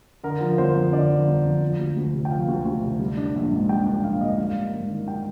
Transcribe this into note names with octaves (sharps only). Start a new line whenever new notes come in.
D3 A#4
F3
G1 C5
F2
D3 D5
F3
G1
F2
F3
D2
D2
C3
G5
F3 F5
D2
D2
C3
G3
D4
A#1
G#2
G3 G5
D4
A#1 F5
G#2 D#5
G3 F5
A#3
G#2
D#3
G3 G5